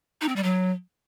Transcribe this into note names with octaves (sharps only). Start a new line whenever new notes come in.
D#4
C4
G3
F#3